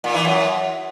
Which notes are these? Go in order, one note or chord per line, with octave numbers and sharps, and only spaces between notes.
A#2
E3
F#2